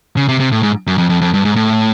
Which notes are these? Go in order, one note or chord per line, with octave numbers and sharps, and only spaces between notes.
C#3
C3
C3
A2
G#2
F#2
F2
F2
F2
G2
G#2
A2